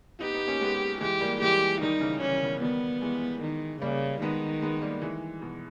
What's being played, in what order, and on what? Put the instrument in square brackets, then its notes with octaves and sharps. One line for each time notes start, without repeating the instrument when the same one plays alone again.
[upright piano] B3 D#4 [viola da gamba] G4
[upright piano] B3 D#4
A#3 C#4
G#3 B3
[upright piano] E3 G#3 [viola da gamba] G4
[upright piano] G3 A#3
[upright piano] E3 G#3 [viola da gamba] G4
[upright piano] D#3 G3 [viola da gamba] D#4
[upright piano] C#3 E3
[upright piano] E3 [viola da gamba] C#4
[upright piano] D#3
C#3
B2 D#3
[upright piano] D#3 G3 [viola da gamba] B3
[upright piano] E3 G#3
[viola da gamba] D#3
[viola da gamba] C#3 [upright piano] G3 A#3
[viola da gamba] D#3 [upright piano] G#3 B3
[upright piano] G#3 B3
G3 A#3
E3 G#3
B2